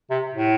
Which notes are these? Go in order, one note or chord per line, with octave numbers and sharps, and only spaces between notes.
C3
A2